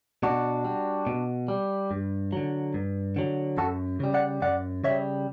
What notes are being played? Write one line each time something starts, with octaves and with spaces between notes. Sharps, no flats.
B2 D4 F#4
G3
B2
G3
G2
D3 F#3
G2
D3 F#3
F#2 F#4 A4
C#3 G3
D5 F#5
F#2 D5 F#5
C#3 G3 C#5 E5